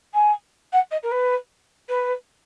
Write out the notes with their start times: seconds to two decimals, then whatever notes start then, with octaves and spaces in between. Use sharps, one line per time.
0.14 G#5
0.73 F#5
0.91 D#5
1.03 A#4
1.12 B4
1.89 B4